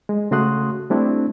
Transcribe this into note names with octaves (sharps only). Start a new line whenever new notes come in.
G#3
C#3 A3 F#4 C6 D#6 F#6
G3 A3 C4 D4 E4